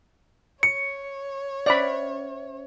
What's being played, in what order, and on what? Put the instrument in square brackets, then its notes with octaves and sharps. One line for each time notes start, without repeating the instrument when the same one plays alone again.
[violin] C#5 [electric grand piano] C#7
[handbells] C#4 C5 E5 [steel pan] D5 B5